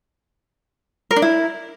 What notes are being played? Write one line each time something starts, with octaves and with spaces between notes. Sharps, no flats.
A#4
D4
E4